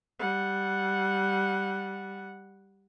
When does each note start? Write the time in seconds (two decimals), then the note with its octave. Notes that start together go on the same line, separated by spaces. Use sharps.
0.19 G3 F#5